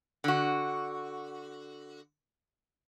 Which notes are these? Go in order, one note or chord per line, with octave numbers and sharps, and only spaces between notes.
D3 F#4